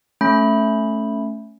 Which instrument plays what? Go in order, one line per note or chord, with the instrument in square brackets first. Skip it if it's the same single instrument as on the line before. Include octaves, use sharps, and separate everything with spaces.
[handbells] A3 C#4 B5